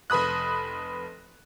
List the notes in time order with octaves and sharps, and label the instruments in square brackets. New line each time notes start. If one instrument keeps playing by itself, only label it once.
[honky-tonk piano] F1 B4 B5 D#6 F#6